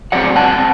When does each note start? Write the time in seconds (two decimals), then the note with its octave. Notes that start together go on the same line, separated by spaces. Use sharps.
0.12 F#3 C4 D5 F#5
0.35 G2 F#5 A5
0.58 C4